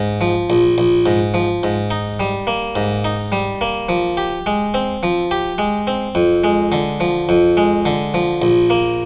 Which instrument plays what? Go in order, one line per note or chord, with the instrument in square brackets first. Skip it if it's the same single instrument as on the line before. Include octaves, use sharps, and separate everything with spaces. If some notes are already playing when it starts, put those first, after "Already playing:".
Already playing: [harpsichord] G#2
F3
A#1
A#1
G#2
F3
G#2
D#4
G3
A#3
G#2
D#4
G3
A#3
F3
G4
G#3
C4
F3
G4
G#3
C4
F2
G#3
D3
F3
F2
G#3
D3
F3
A#1
A#3